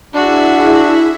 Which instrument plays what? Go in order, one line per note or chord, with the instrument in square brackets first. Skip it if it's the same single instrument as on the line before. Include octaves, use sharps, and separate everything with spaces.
[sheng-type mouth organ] D4 [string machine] E4 G#4 E5 [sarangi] F#4